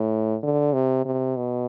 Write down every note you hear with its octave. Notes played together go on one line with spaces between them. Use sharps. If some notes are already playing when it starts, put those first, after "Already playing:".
Already playing: A2
D3
C3
C3
B2